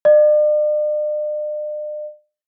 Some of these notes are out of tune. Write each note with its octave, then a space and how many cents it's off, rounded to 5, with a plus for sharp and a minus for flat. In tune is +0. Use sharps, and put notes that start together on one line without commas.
D5 +45